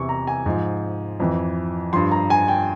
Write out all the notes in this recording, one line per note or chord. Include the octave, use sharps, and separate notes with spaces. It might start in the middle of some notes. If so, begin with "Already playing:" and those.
Already playing: E2 C3 E3 C#6
A#5
G#5
G#2 F3
F2 E3
G2 F3 C6
A#5
G#5
G5